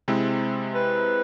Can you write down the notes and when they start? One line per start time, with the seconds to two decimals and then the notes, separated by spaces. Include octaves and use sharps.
0.08 C3 G#3 C4 E4
0.75 B4